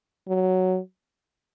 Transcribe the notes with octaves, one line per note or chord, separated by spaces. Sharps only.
F#3